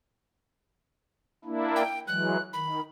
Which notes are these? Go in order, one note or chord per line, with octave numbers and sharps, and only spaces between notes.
A#3 D4 E4
G5
E3 F#3 G#3 F#6
D#3 B5